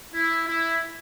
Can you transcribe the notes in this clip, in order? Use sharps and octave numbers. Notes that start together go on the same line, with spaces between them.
E4
E4